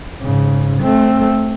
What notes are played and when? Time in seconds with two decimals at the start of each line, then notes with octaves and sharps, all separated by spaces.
0.21 G#2 C#3
0.81 A3 C4